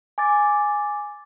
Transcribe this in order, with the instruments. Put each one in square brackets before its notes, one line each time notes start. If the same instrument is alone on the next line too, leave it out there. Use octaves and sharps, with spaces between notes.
[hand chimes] G#5 D6 A6